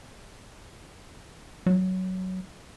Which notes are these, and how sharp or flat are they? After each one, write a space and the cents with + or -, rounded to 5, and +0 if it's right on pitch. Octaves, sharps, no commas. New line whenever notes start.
F#3 +10